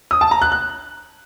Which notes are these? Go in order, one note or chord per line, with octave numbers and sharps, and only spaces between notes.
D#6
A5
A#5
F#6
F#6